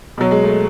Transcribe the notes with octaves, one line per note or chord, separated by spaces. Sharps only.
B2 F#3
G#3
A3